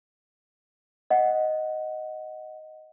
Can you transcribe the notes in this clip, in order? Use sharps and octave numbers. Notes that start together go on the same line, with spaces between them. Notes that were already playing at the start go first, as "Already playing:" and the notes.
D#5 F#5